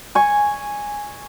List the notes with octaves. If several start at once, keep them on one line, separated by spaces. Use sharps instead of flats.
G#5 C#6